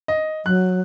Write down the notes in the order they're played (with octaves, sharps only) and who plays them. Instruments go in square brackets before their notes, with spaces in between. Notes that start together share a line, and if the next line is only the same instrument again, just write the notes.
[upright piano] D#5
[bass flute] F#3 [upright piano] F#6